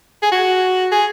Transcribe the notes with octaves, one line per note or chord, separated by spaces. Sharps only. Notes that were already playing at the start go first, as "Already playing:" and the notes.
G#4
F#4
G#4